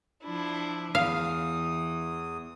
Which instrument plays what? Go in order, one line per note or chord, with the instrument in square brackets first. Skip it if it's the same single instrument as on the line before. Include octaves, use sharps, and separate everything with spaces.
[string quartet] F3 D4 E4
[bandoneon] E2 D#6 [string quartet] E3 [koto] F5